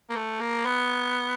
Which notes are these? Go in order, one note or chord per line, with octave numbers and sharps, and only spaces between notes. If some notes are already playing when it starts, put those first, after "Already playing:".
A#3
A3
A#3
B3